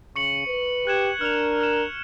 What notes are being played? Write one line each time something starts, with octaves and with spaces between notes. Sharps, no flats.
C#3 C#6 C#7 F#7
B4
G4 F#6 G#6 E7
D4 A#4 F6 F7
F6 E7